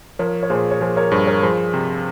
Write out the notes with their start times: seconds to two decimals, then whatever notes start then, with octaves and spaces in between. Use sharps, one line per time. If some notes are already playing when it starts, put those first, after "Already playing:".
0.19 F3 A#4 C#5
0.43 C#5
0.50 A#2 G#4 C5
0.71 C#5
0.81 F3 G#4 C5
0.96 A#4 C#5
1.11 G2 G#4 C5
1.27 A#4 C#5
1.43 F3 G#4 C5
1.74 C3